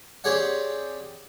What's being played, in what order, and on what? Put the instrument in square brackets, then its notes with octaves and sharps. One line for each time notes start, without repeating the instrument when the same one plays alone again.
[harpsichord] C4 G4 G#4 C#5 D5 F#5